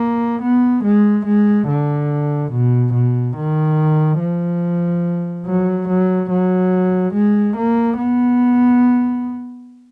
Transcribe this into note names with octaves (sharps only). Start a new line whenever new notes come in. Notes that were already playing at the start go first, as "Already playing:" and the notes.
Already playing: A#3
B3
G#3
G#3
D3
B2
B2
D#3
F3
F#3
F#3
F#3
G#3
A#3
B3